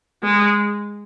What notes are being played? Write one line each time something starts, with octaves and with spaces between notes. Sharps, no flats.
G#3